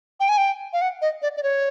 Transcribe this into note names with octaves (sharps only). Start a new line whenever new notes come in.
G5
G#5
G5
F5
F#5
D#5
D5
D5
C#5